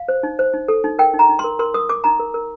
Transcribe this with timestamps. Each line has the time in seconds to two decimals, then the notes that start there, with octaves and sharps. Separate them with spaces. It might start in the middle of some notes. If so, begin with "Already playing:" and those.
Already playing: F5
0.09 C5
0.23 D#4
0.39 C5
0.54 D#4
0.68 A4
0.84 D#4
0.99 A#4 G5
1.14 D#4
1.19 A#5
1.29 D#4
1.39 C6
1.44 A#4
1.59 A#4 C6
1.74 A#4 D#6
1.89 A#4 D6
2.04 D#4 A#5
2.20 A#4
2.34 A#4